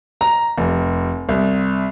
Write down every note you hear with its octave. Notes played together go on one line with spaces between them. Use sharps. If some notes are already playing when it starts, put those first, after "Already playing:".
A#5
F1
C2